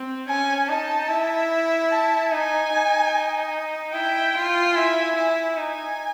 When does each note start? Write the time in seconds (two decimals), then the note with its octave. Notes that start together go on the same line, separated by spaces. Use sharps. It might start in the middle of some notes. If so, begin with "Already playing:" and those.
Already playing: C4
0.28 C#4 G#5
0.69 D#4 A5
1.10 E4
1.91 A5
2.32 D#4 G#5
2.73 D#4
3.94 E4 G5
4.35 F4
4.75 E4 G#5
5.16 E4
5.56 D#4 G#5